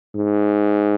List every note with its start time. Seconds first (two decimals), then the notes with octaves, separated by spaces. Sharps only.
0.16 G#2